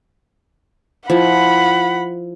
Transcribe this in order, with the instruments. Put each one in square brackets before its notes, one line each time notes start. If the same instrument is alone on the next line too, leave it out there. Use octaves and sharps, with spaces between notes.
[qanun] F3 E4 [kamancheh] F#5 B5